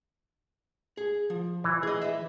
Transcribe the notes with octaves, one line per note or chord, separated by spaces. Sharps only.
G#4
F3
E3
G#4 D#5
B4 E5